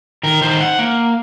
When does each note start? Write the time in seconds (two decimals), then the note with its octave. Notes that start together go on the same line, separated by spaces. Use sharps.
0.23 D#3 A#4
0.41 D#3 C5
0.61 F#5
0.79 A#3